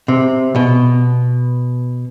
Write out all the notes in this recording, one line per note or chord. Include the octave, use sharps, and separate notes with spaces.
C3
B2